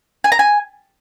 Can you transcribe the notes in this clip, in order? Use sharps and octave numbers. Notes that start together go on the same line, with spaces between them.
G#5
A#5
G#5